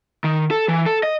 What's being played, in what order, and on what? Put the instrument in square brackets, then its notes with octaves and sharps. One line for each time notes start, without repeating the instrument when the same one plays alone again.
[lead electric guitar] D#3
A4
E3
A4
D#5